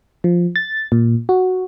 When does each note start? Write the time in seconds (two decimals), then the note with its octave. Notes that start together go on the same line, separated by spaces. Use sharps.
0.24 F3
0.56 A6
0.92 A#2
1.29 F#4